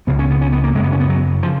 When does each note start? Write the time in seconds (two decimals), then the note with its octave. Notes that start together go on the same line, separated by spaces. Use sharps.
0.07 C#2 C#3 B3
0.19 C#4
0.30 B3
0.41 C#4
0.52 B3
0.64 A#3
0.75 F#2 C#3 G#3
0.83 B3
0.92 C#4
1.00 B3
1.09 F#3
1.42 C#3 F3